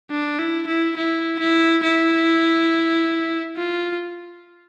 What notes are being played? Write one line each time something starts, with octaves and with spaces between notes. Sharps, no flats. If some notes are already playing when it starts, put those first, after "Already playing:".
D4
E4
E4
E4
E4
E4
F4